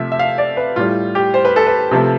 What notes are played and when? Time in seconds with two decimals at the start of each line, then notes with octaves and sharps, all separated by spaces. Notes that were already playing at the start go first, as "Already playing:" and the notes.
Already playing: C3 F3 A3 E5
0.12 E5
0.19 F5
0.38 D5
0.57 B4
0.76 A2 G3 F4
1.15 G4
1.34 C5
1.45 B4
1.56 A4
1.67 B4
1.91 C3 F3 A3